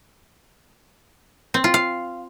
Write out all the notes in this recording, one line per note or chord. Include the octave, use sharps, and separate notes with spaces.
C4
F4
F5